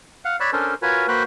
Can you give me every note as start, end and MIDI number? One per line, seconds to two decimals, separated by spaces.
0.25 0.36 77
0.25 0.36 78
0.40 0.50 73
0.40 0.50 74
0.40 0.50 83
0.40 0.50 88
0.40 0.50 90
0.53 0.74 61
0.53 0.74 62
0.53 0.74 69
0.53 0.74 70
0.53 0.74 72
0.82 1.06 65
0.82 1.06 66
0.82 1.06 70
0.82 1.06 71
0.82 1.06 73
0.82 1.06 80
1.08 1.23 58
1.08 1.23 66
1.08 1.23 71
1.08 1.23 72
1.08 1.23 79
1.08 1.23 90